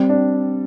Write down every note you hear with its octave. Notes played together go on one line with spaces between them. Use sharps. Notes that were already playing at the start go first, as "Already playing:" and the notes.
Already playing: G3 C4
D4